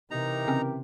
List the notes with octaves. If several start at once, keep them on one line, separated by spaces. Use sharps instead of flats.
C3 E3 D#4 G4 A#4 A#5
C#3 C4 C#4